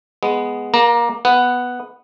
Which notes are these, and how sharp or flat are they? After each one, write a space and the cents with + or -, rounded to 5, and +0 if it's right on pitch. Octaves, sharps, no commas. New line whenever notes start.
G#3 +0 B3 +0
A#3 +20 A#5 -5
B3 +0 F#5 +0